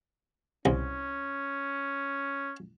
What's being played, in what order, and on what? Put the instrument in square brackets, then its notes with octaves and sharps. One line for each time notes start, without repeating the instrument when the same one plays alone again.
[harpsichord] C2 [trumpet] C#4